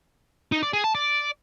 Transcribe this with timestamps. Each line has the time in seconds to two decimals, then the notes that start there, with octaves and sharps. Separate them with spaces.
0.52 D#4
0.63 D5
0.73 G#4
0.84 A5
0.95 D5